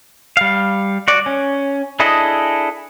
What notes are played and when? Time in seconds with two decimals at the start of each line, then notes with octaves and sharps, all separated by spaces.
0.37 G3 F5
1.08 F#4 D5
1.26 C#4
2.00 D4 E4 G#4 A4 D#5